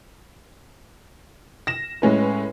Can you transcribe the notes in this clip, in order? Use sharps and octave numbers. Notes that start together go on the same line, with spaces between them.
A#6 E7
A2 G#3 C#4 B4